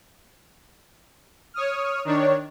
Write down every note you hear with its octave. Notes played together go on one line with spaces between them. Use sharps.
C#5 D#6 F6
D#3 D4 C#5